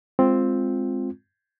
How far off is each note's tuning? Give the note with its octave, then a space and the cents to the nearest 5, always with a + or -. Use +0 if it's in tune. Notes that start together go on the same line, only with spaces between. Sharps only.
G#3 +0 C4 +0 F4 +0